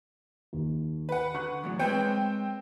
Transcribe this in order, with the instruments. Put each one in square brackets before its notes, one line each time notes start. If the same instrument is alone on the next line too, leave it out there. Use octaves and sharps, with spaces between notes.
[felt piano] D#2
[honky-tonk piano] B4 F#5
[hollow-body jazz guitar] D3 [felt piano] C#6 F#6
[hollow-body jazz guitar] E2 A2 F#3
[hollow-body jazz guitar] G#3 B4 C#5 [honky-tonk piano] C4 G5 G6